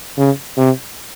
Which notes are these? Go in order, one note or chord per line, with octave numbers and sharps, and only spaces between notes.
C#3
C3